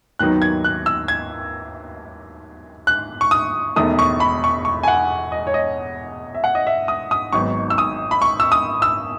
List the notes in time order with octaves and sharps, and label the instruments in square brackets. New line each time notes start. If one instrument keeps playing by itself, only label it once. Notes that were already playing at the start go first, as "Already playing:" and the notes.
[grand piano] D#2 D#3 F#3 B3 D#4 F#6
G#6
F#6
E6
G#6
F#6
C#6
D#6
E1 E2 D#3 A3 D#6
C#6
B5
C#6
C#6
G#5
F#5
D#5
C#5
D#5
E5
F#5
D#5
E5
D#6
D#6
G#1 G#2 F#3 B3 D#4 C#6
E6
D#6
B5
C#6
E6
D#6
E6